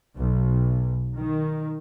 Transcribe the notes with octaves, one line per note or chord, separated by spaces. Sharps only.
B1
D#3